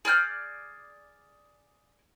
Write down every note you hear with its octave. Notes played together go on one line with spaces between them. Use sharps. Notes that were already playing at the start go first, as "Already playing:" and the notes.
G#4 D5 F6 G6